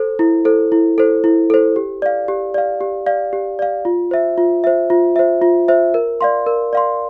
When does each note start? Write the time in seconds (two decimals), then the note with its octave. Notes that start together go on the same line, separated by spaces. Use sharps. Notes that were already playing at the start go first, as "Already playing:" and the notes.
Already playing: A4 C5
0.19 E4
0.45 A4 C5
0.72 E4
0.98 A4 C5
1.24 E4
1.50 A4 C5
1.76 G4
2.02 D5 F5
2.28 G4
2.54 D5 F5
2.81 G4
3.06 D5 F5
3.33 G4
3.59 D5 F5
3.85 F4
4.11 C5 E5
4.38 F4
4.64 C5 E5
4.90 F4
5.16 C5 E5
5.42 F4
5.68 C5 E5
5.94 A#4
6.21 D5 F5 C6
6.47 A#4
6.73 D5 F5 C6